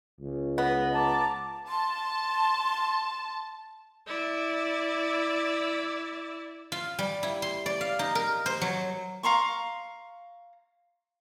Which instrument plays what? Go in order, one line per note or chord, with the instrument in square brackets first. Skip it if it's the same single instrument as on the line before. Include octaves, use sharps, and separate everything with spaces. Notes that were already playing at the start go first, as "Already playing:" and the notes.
[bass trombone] C#2
[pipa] B3 [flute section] B4 D#5
[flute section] A5 A#5 D6
[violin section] A5 [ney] C6
[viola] E4 D5
[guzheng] F4
G3
E4
C6
D5
F5
D#4
A#4
C5
F#3
[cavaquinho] F5 A#5 C6 C#6